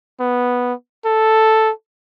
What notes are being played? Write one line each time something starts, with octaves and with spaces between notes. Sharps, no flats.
B3
A4